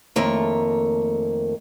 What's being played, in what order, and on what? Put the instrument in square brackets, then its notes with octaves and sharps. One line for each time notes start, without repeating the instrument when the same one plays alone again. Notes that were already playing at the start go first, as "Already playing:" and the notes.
[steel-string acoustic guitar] F2 D#3 A3 A#3 C#5